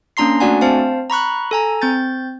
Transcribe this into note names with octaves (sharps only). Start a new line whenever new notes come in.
A#3 C#4 D4 A#5 C6 C7
A3 D4 F#4 D5 F#5 G#5
C4 C5 F5 A5
A#5 B5 C#6 F#6
A4 G#5 A#5
C4 G6 A6